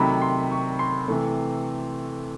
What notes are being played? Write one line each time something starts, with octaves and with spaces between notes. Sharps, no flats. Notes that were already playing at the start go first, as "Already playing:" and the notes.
Already playing: C3 D#3 F#3 A3 B5
C6
C#6
C6
C3 E3 A3